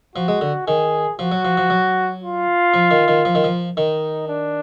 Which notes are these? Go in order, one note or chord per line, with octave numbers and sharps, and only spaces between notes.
F3 F#4
G#3
D3
D#3 G#4
F3 F#4
F#3
F3
F3
F#3
F4
F3
D#3
D#3
F3
D#3
F3
D#3 D#4
D4